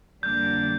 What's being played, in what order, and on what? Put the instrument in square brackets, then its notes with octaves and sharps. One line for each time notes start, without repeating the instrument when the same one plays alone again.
[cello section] F2 D3 G3 A#3 D4 [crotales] G6